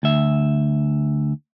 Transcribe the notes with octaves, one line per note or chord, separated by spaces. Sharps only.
D2 E5